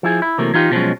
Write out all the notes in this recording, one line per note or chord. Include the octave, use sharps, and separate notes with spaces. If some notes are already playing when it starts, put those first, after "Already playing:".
F3 E4 G#4
E4
C3 E3 F#3 A3 A#3
E3 D#4 F4 G4
B2 D3 F3 F#3 G#3 C#4